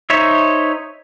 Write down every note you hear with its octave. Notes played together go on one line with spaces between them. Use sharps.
D#4 C5 C#5 E5